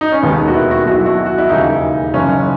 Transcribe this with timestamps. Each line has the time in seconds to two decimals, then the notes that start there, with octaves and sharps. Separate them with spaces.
0.01 D#4
0.12 C#4
0.22 E1 D#2 D#3 B3
0.48 F#4
0.54 E4
0.71 F#4
0.86 B1 B2 F#4
0.96 E4
1.06 F#4
1.26 F#4
1.38 E4
1.49 E1 D#2 C#3 E3 D#4
2.13 F#1 F#2 C#3 E3 C#4